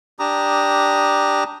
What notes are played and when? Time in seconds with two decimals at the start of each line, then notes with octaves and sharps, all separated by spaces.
0.19 D4 G4 A#5 D#6